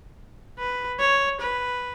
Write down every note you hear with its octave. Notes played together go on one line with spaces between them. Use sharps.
B4
C#5
B4